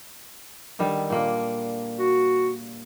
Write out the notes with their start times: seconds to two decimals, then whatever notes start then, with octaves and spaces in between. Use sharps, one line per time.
0.79 D3 D#3 G3
1.10 A#2 A#3 D4
1.99 F#4